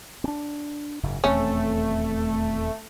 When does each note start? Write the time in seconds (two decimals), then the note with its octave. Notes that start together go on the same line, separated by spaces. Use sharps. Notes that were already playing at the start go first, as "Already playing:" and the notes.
0.24 C4 D4
1.03 F#1 G#2 C#3
1.24 D#1 E2 A3 C4 C#4